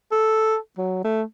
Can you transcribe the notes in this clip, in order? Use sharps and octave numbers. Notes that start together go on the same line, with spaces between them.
A4
F#3
A3